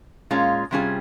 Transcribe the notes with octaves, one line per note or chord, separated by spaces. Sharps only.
A#2 G#3 C#4 F4
C3 G3 C#4 F4 G#4